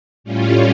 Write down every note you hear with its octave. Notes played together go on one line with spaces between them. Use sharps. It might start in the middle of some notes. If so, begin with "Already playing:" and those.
A2 G3 C#4 F4